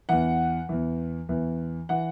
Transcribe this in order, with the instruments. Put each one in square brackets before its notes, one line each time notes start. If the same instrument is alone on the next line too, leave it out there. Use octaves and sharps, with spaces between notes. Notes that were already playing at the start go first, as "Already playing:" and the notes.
[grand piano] E2 E3 F#5
E2 E3
E2 E3
E3 F#5